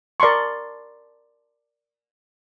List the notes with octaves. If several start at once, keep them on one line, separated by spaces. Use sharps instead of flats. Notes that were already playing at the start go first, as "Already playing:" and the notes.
A#4 D5 A5 C6 C#6